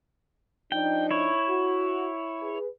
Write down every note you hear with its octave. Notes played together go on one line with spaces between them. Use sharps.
F3 D4 D#4 G5
E4 C#5
F#4
G#4 B4